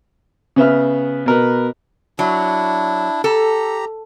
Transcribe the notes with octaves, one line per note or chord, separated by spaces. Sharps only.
C#3 B3 E5 F6
B2 A#4 B4
F#3 D4 E4
G4 A4 A#5